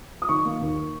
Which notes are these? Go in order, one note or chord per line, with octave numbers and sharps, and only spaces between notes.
D#6
D#3 C#6
A#3
D#2